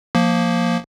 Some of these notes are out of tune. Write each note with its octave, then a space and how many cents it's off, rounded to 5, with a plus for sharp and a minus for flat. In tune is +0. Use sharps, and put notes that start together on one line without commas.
F3 +10 A#3 +0